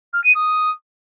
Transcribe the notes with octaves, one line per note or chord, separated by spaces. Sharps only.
F6
D#7
D#6